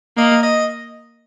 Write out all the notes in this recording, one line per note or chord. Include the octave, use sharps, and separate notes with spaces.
A#3 D#5
D#5